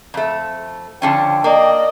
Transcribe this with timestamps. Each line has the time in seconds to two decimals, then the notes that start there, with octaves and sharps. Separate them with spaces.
0.14 F2 A3
1.02 D3 F3 C#4 G5
1.44 A#3 D5 D#5